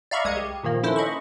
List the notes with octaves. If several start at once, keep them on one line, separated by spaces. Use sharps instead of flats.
D5 E5 F5 A#5 B5 C#6
C2 G#3 D#6 G#6 C#7
G4
A#2 D#3 F3 A#3
C#4 E4 A4 B4 C5
D#5 B5 C#6